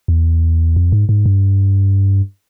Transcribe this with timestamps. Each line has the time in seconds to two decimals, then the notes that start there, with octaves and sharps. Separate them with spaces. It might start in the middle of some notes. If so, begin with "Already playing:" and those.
0.08 E2
0.76 F2
0.92 G#2
1.09 G#2
1.26 G2